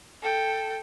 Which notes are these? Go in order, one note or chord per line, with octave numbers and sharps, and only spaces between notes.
A4 G5